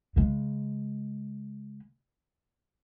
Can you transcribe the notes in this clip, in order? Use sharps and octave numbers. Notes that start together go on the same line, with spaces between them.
C#3 G#3